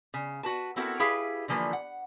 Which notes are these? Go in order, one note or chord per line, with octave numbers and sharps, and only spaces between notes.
C#3
F#4 B4 A5
B3 C4 E4 F#4 A4 A#4
E4 G4 G#4 B4 E5 F5
D3 E3 F3 A#3 B4
F#5